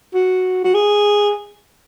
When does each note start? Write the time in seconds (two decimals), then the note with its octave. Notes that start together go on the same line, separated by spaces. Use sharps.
0.14 F#4
0.64 F#4
0.75 G#4